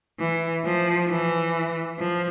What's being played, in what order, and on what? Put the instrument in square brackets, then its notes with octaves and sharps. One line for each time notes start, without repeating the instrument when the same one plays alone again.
[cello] E3
F3
E3
F3